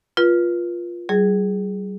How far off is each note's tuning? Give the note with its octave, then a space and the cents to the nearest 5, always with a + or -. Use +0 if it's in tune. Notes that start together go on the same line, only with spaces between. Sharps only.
F4 +0 B4 -35
G3 -40 G#4 +0